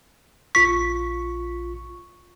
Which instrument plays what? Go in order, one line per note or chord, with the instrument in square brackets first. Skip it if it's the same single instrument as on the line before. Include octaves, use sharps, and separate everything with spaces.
[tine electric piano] A#1 F4 C#6 [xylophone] B6